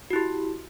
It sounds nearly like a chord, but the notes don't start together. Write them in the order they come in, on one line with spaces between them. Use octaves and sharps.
F#4 E4 G4